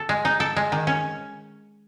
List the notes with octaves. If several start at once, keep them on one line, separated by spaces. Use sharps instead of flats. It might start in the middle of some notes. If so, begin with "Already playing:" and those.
Already playing: A4
G#3
D#4
A4
G#3
D#3
C#4